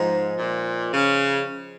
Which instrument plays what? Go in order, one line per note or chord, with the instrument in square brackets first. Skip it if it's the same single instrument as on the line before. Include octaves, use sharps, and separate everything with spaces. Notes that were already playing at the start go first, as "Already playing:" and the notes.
Already playing: [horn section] G#2 [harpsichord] F3 G#3 D#4
[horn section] A#2
C#3